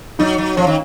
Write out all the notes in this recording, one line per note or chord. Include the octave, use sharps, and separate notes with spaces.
F#3 D#4
F#3
F3 C#4
D#3